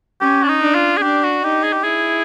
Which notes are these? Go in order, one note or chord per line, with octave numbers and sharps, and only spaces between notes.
C#4 G4
D4
D#4
D4
F4
G#4
D4 G4
F#4
D#4 G4
G#4
G4
E4 G#4